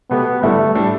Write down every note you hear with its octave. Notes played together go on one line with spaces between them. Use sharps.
B2 A3 B3 G4
G1 G2 G3 A3 E4
A2 G3 D4 A4